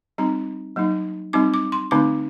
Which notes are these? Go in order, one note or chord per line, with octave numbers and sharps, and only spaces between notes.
G3 C4 D#4 A#5
F#3 A#3 D#4
G3 C4 D#4 D6
D6
C6
D3 A3 C4 D#4 D6